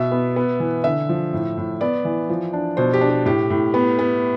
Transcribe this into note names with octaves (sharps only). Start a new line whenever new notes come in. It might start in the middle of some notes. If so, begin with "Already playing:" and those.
Already playing: B2 E5
B3
B3
E3
D3 E5
F3
A2
A2
B3 D5
E3
F3
D4
B2 C5
G4
D4
G4
A2 G4
A2
B3
B3